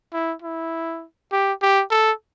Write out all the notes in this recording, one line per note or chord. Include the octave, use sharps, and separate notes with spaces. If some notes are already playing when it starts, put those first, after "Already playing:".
E4
E4
G4
G4
A4